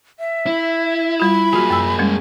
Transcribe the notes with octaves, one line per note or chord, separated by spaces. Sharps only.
E5
E4
G3 F4 B5
A#3 F4 F#4 G#4
F#2 E6
G3 G#3 C#4